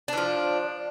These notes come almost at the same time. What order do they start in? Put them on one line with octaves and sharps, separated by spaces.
D4 E3 F3